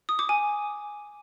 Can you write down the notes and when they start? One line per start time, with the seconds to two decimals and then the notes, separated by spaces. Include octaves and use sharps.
0.09 D#6
0.19 D6
0.29 G#5